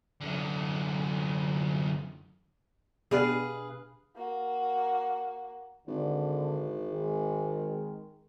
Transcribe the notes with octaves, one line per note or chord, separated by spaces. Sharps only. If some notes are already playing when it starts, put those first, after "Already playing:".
F#2 D3
B2 D4 G4 G#4 B4 F5
A#3 F#4
G#1 D3
D#3 G#3